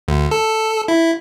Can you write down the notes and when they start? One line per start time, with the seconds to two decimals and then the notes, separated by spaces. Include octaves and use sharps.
0.08 D2
0.31 A4
0.88 E4